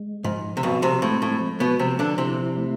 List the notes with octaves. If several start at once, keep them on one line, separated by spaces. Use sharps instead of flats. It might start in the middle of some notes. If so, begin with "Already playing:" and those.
Already playing: G#3
G#2 F3
C3
B1 B2 C4
C2 C3
A2 G#3
A2
F3
B2 B3
C3 F3 C4
D3 D4
C3 C4 E4
A3